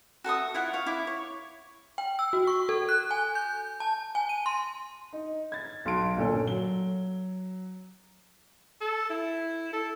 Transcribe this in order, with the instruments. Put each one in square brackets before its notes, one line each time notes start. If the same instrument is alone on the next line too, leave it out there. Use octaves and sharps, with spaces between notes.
[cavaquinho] F#4 A4 E5 D#6
E4 F4 F#5
C#5 F5
E4 D6
C#5
[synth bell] G5
E6
F#4
C#6
A4
F#6
G#5
G6
A5
G#5
D#7
C6
[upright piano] D#4
G#6 A6
B1 C6 D7
G1 A#2 C#4 A4
F#3 G7
[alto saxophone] A4
E4
A4